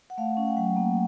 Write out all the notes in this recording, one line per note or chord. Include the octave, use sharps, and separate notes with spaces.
F#5
A3 F5
C#4
G5
F#3 F#5
A#3